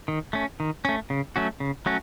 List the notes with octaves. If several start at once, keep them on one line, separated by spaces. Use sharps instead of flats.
D#3
A3 C#4
D#3
A3 C#4
C#3
F#3 A3 C#4 F#4
C#3
F#3 A3 C#4 F#4